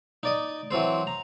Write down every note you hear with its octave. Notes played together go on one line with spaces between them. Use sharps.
D#4 D5 D#5
E3 F#3 C4 C5
A#5